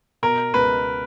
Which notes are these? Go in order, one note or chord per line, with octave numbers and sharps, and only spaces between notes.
B2 A#4
C#2 B4